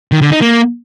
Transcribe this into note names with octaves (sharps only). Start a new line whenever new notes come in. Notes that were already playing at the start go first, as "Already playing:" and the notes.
D#3
D3
D#4
A#3